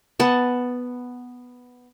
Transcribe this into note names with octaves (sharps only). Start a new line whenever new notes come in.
B3 A5